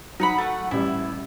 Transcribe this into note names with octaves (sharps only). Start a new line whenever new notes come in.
F#3 D#4 F#5 B5
A3 F#5
A1 G3 E4